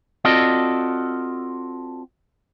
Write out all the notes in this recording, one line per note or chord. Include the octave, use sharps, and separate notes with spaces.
C4 F4 F#4 A4 D5 D#5